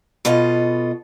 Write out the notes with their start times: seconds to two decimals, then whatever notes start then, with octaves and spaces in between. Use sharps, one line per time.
0.25 B2 F4 A4 D#5